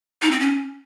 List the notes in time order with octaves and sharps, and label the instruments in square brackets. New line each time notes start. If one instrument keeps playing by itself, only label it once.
[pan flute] D#4
C4
C#4